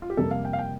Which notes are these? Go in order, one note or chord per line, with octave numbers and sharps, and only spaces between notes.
F4
G4
F2 C3 G3 A#3 A4
F5
G5
F5
G5